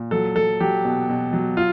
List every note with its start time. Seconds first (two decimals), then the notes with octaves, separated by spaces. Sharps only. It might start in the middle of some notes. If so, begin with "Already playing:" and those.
Already playing: A#2
0.11 F#3 A4
0.36 F#3 A4
0.60 F#3 G4
0.85 B2
1.09 B2
1.33 F#3
1.57 F4